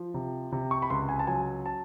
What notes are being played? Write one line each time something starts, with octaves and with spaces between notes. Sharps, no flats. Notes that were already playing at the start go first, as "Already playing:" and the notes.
Already playing: F3
C3
C3
C#6
B5
C#2 C6
G#5
A5
F#3 G#5
A5